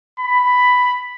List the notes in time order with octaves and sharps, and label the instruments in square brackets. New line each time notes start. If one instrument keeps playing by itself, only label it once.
[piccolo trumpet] B5